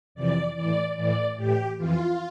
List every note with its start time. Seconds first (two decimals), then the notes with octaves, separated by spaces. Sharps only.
0.15 F2 C3 E3 D5
0.56 A2 E3 D5
0.96 A2 E3 D5
1.37 A2 E3 G4
1.78 F2 E3 F4